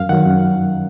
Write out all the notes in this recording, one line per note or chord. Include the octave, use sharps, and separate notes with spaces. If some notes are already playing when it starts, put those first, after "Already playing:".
Already playing: F#2 F5
D#3 F#3 F#5
F#2